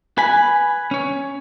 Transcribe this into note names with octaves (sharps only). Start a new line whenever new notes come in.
B4 G#5 B5
C#4 C#5